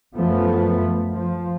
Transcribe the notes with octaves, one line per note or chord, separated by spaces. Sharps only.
F#2 F3 A3 B3
F3